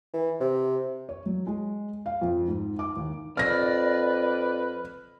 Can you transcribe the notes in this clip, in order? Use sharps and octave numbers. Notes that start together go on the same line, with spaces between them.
E3
C3
C#5
F#3
G#3
F5
F2
G#2
D6
D#2
F2 B4 D5 F6 A#6